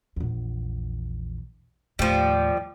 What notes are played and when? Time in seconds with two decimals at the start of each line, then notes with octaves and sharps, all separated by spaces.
0.16 A#1 E2
1.99 D#2 A2 F3 G3